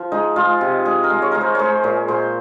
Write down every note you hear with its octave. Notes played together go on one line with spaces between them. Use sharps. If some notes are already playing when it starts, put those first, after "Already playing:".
Already playing: F3 C5
G#3 D#4
G#3 F4
C3
G#3 G#4
A#4
G#3
C#5
G#3 A#4
C5
G#3 C5 C#5
A#2 C#5
A#2 C5